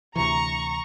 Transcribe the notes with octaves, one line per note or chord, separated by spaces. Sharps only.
D2 C3 E3 A#5 C#6